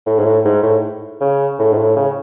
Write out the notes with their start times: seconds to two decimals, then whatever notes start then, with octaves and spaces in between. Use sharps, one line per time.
0.06 A2
0.19 G#2
0.25 A2
0.45 G#2
0.63 A2
1.21 C#3
1.59 A2
1.73 G#2
1.78 A2
1.96 C#3